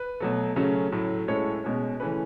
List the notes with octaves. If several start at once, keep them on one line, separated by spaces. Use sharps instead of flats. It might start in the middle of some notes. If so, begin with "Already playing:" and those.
Already playing: B4
B2 F#3 A3
C#3 F#3 A3 C#4
A2 F#3 A3
A2 G#3 C#4 A4 C#5
B2 G#3 C#4
C#3 E3 A3 C#4 B4